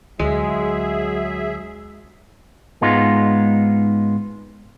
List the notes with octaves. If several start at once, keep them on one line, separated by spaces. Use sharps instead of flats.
D2 D3 F#3 G#3 G#4 E5
G#2 G#3 B3 D#4 F4